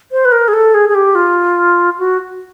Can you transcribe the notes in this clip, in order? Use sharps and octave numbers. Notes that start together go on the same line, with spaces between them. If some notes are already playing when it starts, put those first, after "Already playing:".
C5
B4
A#4
G#4
A4
G#4
G#4
G4
F4
F#4